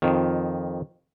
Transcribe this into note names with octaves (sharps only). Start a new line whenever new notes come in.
F2 D#3